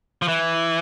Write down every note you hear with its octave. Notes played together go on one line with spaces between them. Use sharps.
F3
E3